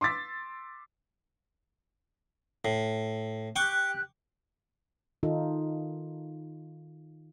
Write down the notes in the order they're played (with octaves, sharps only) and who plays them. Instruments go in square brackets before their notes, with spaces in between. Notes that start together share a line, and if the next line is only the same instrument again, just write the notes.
[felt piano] C6 D6 E6 A6 B6
[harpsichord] A2
[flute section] G4 F#6 [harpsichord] G5 C#6 D6
[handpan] D#3 D#4 F4 A4